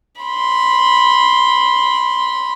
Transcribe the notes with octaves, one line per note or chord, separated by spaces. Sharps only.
B5 C6